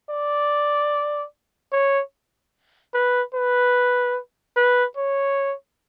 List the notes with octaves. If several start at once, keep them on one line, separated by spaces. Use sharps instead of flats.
D5
C#5
B4
B4
B4
C#5